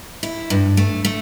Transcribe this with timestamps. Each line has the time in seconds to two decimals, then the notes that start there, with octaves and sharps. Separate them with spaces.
0.23 E4
0.50 G2
0.77 A3
1.05 A3